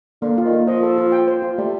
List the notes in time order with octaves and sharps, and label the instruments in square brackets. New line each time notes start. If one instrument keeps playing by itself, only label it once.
[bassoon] D3 [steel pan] A#3
[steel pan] F4
[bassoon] D#3
[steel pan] A#3
[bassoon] F3 [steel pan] D#5
[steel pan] A4
F4
G5
C5
F4
[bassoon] G3 [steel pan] A3